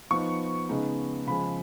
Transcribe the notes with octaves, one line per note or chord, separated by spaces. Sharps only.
F3 B3 D#4 C#6
C#3 G#3 B3 D#4
C#3 F3 G#3 B5